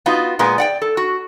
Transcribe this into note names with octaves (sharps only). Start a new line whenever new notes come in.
B3 D#4 F4 F#4
A#2 G#3 B3 G#4
D5 F#5 G5
A4
F#4